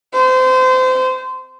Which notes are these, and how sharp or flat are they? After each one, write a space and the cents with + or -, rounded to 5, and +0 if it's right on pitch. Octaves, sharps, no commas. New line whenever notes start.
C5 -25